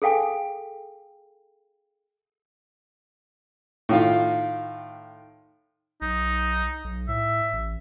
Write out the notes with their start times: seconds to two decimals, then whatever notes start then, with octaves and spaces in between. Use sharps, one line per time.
0.02 G#4 A4 F5 G5 G#5
3.89 A2 D#3 F4
6.01 B1 D#4
6.84 B1
7.08 A2 E5
7.53 A1